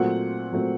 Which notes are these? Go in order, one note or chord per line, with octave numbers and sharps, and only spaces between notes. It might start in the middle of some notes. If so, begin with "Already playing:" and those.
Already playing: A#2 F#3 A3 C4 F#5
A#2 F#3 A3 C4